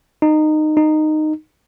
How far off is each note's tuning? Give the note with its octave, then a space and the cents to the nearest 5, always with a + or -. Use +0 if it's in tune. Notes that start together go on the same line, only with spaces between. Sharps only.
D#4 -20
D#4 -15